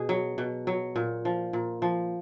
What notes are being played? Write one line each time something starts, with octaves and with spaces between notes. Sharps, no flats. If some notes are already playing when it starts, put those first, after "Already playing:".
Already playing: B2 G#4
F#3
B2
F#3
A#2
F3
A#2
F3